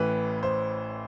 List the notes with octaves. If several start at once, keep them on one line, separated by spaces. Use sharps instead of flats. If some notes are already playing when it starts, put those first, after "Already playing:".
Already playing: A1 A2 E3 B4
C5